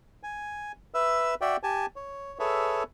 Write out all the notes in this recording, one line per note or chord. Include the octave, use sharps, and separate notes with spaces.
G#5
B4 E5 E6
F#4 D5 E5 G5
G4 G#5 A5
C#5
G#4 A4 B4 C#5 E5